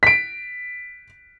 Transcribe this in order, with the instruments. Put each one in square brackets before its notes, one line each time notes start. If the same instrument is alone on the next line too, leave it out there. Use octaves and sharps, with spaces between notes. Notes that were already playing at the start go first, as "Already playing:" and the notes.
[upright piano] B6 D7